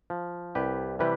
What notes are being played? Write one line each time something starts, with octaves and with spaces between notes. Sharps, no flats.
F3
C2 G4 B4
C3 E3 G3 G4 B4